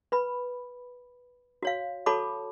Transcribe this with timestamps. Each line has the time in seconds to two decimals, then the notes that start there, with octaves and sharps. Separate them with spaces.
0.12 B4 B5
1.63 F#4 C#5 F5
2.06 F#4 A4 C#5 A5 B5 D6